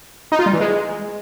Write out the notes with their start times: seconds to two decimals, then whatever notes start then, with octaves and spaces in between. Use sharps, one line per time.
0.32 D#4
0.39 F4
0.46 G3
0.53 E3
0.60 G#3